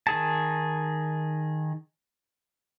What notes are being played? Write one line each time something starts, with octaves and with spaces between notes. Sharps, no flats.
D#3 G#4 A5